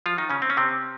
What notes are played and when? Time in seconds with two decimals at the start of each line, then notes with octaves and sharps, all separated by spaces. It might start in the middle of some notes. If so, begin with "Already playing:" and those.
0.06 F3 F4
0.18 D#3 D#4
0.29 C#3 C#4
0.42 C4
0.50 C#4
0.57 C3 C4